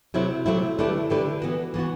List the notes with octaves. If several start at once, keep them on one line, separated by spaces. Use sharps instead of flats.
C3 F#3 A3 C4 E4
C3 F#3 A3 C4 E4
D3 A3 E4 G4 B4
D3 A3 E4 G4 B4
E3 B3 F#4
E3 B3 F#4